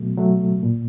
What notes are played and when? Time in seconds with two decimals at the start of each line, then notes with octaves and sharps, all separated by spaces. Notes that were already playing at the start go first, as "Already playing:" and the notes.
Already playing: B2 F#3 A3
0.17 F#3 A3
0.63 A#2